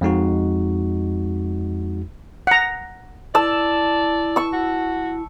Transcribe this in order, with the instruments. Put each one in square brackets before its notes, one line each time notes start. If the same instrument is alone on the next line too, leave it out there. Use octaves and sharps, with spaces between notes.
[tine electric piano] F2 G#3 D#4 F#4
[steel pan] F#5 A#5
[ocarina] E4 [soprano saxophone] D5 [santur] A5 E6
[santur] C#6 E6
[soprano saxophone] F#4